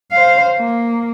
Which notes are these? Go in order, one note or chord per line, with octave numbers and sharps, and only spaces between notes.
C5 F5
A#3